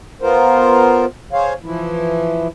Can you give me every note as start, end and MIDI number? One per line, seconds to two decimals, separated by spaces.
0.22 1.05 59
0.22 1.05 65
0.22 1.05 70
0.22 1.05 72
1.33 1.54 68
1.33 1.54 72
1.33 1.54 73
1.33 1.54 77
1.63 2.47 52
1.63 2.47 53
1.63 2.47 64